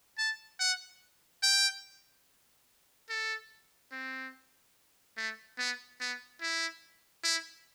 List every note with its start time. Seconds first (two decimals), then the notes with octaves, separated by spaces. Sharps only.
0.18 A5
0.60 F#5
1.43 G5
3.10 A4
3.92 C4
5.17 A3
5.58 B3
6.00 B3
6.42 E4
7.24 E4